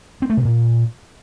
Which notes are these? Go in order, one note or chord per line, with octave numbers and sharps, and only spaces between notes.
C4
A3
C3
A#2